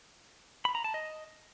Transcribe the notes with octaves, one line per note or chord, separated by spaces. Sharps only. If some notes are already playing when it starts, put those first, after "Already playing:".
B5
A#5
A5
D#5